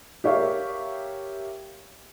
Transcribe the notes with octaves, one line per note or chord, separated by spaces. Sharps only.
G4 A#4 C#5 E5 F5